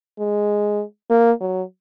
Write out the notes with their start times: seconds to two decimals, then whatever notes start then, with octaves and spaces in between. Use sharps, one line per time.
0.19 G#3
1.10 A#3
1.41 F#3